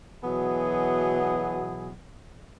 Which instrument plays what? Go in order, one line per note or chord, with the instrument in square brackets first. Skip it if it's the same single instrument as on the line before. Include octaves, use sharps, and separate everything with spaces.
[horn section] B2 E3 F#3 B3 G#4